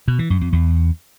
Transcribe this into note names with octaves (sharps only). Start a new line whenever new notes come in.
B2
E3
F#2
F2
E2